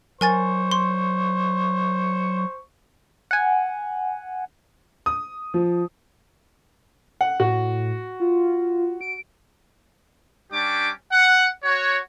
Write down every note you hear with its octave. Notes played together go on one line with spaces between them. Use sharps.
F#3 A#4 C5 G#5 C#6 A6
C6
F#5 G#5
D#6
F3
F#5
A2 F#4
F4
D7
G3 C#4 D4 G4 D6
F#5
F#4 C#5